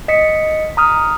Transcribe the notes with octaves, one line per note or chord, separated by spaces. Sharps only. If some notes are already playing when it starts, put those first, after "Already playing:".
D#5 B6 C#7
A#5 D#6 F6